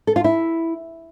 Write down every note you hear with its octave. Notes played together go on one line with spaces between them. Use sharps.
A4
F4
E4